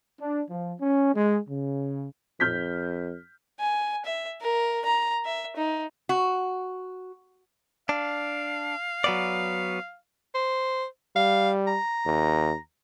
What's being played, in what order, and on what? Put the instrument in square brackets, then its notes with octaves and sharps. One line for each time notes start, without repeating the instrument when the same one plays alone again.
[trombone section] D4
F3
C#4
G#3
C#3
[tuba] F2 [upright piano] F6 G6 B6
[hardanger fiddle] G#5
E5
A#4
A#5
E5
D#4
[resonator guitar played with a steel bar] F#4
[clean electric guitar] D4 [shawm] F5
[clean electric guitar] F#3 B3 D5
[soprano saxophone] C5
[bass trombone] G3 [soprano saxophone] F5
[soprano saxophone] A#5
[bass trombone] D#2